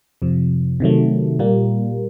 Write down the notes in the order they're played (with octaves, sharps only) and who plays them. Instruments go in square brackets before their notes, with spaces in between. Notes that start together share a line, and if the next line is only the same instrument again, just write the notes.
[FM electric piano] F2 C3 F3
C3 D#3 F#3 A3
A#2 G3 A#3